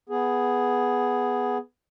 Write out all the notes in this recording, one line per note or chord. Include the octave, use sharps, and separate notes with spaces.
B3 G#4